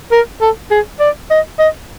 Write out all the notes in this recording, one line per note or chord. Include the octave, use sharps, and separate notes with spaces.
A#4
A4
G#4
D5
D#5
D#5